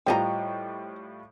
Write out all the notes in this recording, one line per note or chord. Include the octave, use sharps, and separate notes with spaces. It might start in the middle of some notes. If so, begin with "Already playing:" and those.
A2 G3 F4 C5 D#5 G5 A#5